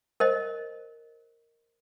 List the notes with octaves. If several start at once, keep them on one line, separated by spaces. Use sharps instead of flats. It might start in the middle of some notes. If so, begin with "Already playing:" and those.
A#4 C5 D#5